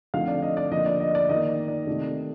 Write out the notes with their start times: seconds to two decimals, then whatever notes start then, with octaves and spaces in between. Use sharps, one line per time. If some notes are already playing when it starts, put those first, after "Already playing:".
0.14 D3 F3 A3 C4 D#4 F5
0.28 D5
0.42 D#5
0.57 D5
0.71 D3 F3 A#3 D#5
0.86 D5
1.00 D#5
1.15 D5
1.29 D#3 A#3 D#4 D#5
1.68 D5
1.87 C3 D#3 A3